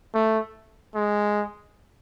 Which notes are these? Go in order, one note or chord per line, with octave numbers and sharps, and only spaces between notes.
A3
G#3